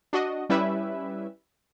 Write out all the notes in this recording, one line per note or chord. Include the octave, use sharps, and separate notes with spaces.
D4 F#4 D#5
G3 C#4 E4 B4 E5